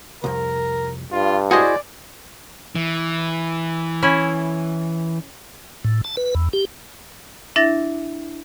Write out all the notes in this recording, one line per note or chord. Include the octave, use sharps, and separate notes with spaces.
C2 F2 A#4
G2 F4
E4 F#4 G#4 C5 D5 D#5
E3
C#4 E4
A2
A5
B4
E2
G4
D4 E4 E5 A6 A#6